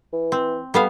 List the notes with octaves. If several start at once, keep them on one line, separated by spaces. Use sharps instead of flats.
E3
C4
G3 B3 A4 F5